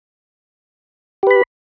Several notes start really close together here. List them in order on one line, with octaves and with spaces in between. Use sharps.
G4 B4 B5